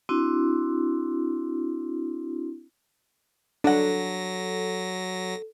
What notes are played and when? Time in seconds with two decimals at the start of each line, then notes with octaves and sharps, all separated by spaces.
0.09 C4 D4 E4 F#4
3.64 F#3 D4 A4 F#5 A#6